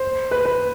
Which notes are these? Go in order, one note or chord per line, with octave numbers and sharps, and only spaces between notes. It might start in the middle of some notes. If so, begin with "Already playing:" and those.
Already playing: C5
B4
B4